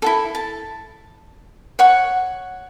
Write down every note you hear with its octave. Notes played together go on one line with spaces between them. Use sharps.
E4 F4 A4
A5
C#5 F#5 C#6